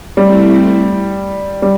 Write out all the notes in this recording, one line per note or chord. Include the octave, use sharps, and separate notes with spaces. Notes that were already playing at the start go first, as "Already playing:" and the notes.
G3 A3 C4 E4
G3